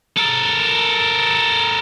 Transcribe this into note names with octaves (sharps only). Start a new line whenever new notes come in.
A4 A#4